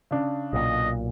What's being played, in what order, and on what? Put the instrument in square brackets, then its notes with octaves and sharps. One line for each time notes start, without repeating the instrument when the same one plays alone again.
[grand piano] C#3 D4
[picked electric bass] B1 A#2 [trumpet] D#5